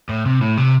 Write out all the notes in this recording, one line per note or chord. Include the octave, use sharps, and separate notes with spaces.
A2
C3
A2
C3